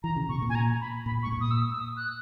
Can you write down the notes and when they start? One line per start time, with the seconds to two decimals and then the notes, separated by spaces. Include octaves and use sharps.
0.03 E3 A#5
0.16 C#3
0.29 B2 C#6
0.42 A#2
0.49 G#5
0.55 A#5
0.80 B5
1.06 A#2 B5
1.23 C#6
1.26 G#2
1.32 A#2
1.41 D#6
1.51 E6
1.61 D#6
1.71 E6
1.81 D#6
1.97 F#6